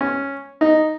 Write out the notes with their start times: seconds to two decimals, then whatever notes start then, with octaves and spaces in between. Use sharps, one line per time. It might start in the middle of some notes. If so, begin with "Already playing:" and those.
0.01 C#4
0.61 D#4